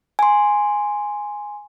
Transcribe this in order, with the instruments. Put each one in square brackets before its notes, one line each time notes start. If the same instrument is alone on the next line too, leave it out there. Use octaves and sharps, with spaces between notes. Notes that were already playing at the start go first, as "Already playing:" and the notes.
[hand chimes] G#5 C6